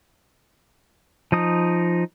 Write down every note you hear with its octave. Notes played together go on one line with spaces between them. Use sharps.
F3 D#4 D#6